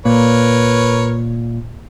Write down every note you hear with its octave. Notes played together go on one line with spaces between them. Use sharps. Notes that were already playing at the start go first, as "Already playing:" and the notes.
A#2 A#4 B4 C#5